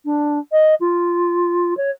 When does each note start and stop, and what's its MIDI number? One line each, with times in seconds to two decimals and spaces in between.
0.05 0.39 62
0.52 0.75 75
0.80 1.76 65
1.77 1.91 73